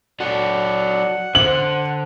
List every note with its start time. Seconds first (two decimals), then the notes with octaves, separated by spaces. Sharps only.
0.20 F#3 F#4 A4 D5 F#5
1.35 D3 C5 F#7